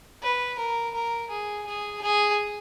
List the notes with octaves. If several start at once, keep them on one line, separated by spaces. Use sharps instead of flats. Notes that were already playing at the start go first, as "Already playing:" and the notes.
B4
A#4
A#4
G#4
G#4
G#4